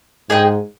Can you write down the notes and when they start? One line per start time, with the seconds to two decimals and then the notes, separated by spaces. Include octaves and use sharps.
0.30 G#2 G#4 D#5 G5